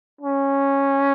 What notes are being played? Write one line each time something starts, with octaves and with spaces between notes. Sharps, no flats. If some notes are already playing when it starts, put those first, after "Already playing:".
C#4